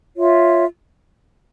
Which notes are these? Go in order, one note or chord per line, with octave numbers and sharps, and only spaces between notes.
F4 C#5 E5